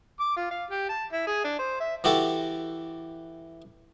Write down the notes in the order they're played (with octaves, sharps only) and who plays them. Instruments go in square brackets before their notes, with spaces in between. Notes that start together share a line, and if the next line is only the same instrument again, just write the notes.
[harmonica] D6
F4
F5
G4
A5
E4
G#4
D4
C5
E5
[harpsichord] E3 F#4 G4 A4